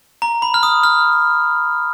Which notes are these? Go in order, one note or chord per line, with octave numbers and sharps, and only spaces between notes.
A#5
B5
F6
D#6
F6